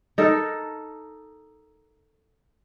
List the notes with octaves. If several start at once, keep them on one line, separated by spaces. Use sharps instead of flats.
D#4 A4 A#4